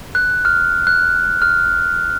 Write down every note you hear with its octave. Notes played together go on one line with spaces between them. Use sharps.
F#6
F6
F#6
F6